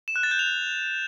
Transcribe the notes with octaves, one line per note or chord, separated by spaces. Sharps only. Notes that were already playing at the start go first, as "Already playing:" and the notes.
E7
F#6
A6
G6
F7